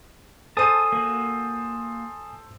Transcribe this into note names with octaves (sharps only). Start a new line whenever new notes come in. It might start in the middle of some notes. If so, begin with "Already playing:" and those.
A4 C5 G#5 A5 D#6 D#7
A#3 F#4